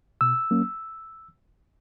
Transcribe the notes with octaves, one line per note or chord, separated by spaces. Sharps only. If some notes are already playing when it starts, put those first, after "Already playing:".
B2 E6
F#3 A#3 C#4